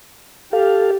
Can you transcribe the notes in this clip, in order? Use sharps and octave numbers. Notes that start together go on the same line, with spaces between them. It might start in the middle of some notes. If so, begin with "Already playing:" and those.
G4 A4 F5